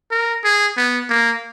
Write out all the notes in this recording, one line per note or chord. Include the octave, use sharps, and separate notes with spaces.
A#4
G#4
B3
A#3